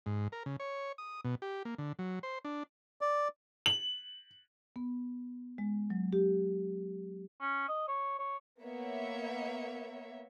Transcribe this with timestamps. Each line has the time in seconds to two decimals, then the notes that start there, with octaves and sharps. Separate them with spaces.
0.06 G#2
0.32 A#4
0.46 C#3
0.60 C#5
0.98 D#6
1.24 B2
1.42 G4
1.65 A#3
1.78 D3
1.99 F#3
2.23 C5
2.45 D4
3.01 D5
3.66 F#7
4.76 B3
5.58 G#3
5.90 F#3
6.13 G4
7.41 C#4
7.68 D#5
7.88 C#5
8.19 C#5
8.62 A#3 B3 C#5 E5